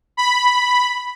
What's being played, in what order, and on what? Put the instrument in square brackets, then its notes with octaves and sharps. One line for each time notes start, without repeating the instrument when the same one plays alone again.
[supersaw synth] B5